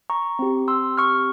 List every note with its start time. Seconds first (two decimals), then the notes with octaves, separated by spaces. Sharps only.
0.10 A#5 C#6
0.39 C4 G4
0.68 C6 E6
0.98 C#6 F6